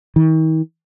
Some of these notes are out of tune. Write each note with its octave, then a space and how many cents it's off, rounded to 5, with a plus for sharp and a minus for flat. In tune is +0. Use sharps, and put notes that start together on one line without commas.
D#3 +40